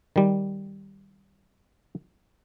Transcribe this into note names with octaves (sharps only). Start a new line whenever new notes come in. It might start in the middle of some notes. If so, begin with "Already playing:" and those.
D#3 G3